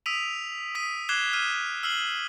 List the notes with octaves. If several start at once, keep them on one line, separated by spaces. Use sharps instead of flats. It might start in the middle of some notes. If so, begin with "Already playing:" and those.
D#6 E6 B6 D7 D#7 F7
D#6 B6 D#7
D6 F#6 G#6 C7 E7 G7
F6 F#6 D#7 E7
E6 F6 C7 F#7